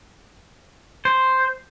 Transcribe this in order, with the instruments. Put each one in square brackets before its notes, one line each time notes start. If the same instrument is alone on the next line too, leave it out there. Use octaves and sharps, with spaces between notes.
[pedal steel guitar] C5